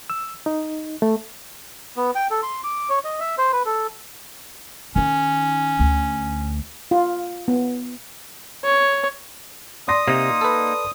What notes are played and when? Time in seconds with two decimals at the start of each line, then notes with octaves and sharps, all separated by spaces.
0.10 E6
0.46 D#4
1.02 A3
1.97 B3
2.15 G5
2.31 A4
2.43 C6
2.64 D6
2.89 C#5
3.04 D#5
3.20 E5
3.38 C5
3.52 B4
3.66 A4
4.95 D#3 C#4 D#4
5.79 D2
6.91 F4
7.48 B3
8.64 C#5
9.88 D5 C6 D#6 A#6
10.08 C3 A#3 D#4
10.41 A4 B4